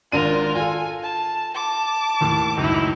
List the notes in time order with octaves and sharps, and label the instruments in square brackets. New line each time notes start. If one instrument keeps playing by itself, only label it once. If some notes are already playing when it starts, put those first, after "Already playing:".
[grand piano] G#1 D4 D#7 [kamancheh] F4 A#4
[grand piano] F4 A4 [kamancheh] G#5
[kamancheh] A5
A5 D6
[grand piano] D#2 A2
[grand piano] C#2 F#2 A2 [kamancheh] D#4 E4